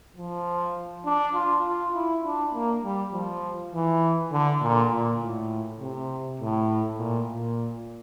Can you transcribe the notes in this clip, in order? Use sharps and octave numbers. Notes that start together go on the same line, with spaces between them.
F3
D4
F4
F4
E4
D4
A#3
G3
F3
E3
D3
A#2
A#2
A2
C3
A2
A#2
A#2